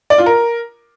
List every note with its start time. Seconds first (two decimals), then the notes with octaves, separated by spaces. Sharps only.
0.10 D5
0.18 F4
0.26 A#4